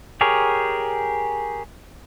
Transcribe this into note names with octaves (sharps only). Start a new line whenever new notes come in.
G4 G#4 A#4 C#5